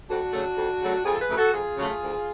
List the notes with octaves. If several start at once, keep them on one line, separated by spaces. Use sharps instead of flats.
F2 D4 F#4
C#3 F#3 A3
F2
C#3 F#3 A3
F2 F4 G#4
A4
G#4 B4
C#3 F#3 A3
F#4 A4
F2 F4 G#4
C#3 F#3 A3
D2